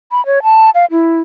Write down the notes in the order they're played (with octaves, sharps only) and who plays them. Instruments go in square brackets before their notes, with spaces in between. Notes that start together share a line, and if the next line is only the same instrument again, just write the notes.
[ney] B5
C#5
A5
F5
E4